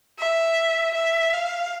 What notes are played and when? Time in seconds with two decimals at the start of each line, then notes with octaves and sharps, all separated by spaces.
0.19 E5
0.95 E5
1.33 F5